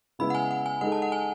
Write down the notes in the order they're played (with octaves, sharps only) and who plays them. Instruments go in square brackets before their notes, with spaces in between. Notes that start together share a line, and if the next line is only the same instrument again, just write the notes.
[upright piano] C#3 G#3 B3 E4 B4 [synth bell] B5
[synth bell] F#5
G#5
F#5
G#5
[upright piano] G#3 D#4 A4 [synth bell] F#5
[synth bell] A5
F#5
G#5